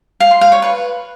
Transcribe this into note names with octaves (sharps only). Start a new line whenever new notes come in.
F5
C6
F5
C#5
B4